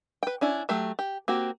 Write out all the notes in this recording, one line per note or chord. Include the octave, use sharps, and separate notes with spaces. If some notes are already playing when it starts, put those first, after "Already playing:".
B4 G5
C#4 D4 E4
F#3 A3 G4
G4
A#3 C4 F#4 G4